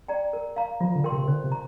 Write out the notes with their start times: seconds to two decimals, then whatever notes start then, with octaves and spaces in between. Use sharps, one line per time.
0.08 D5 G5 A#5
0.33 A#4
0.56 F5 A#5
0.80 F3 F4
0.95 D3
1.04 A#4 G5 C6
1.12 C3
1.23 C3
1.28 D3 C5
1.44 C3
1.52 A#5